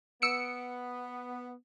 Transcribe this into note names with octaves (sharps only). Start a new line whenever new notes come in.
B3 E6 C#7 D7